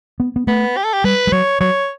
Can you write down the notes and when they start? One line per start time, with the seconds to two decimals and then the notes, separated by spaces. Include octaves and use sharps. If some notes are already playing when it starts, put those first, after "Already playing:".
0.20 B3
0.36 B3
0.47 A3 B3
0.77 G4
0.84 A4
0.93 G4
1.04 G3 B4
1.27 G3
1.32 F#3 C#5
1.60 F#3 C#5